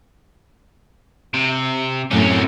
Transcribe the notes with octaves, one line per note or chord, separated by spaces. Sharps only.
C3
F#2 A2 C3 C#4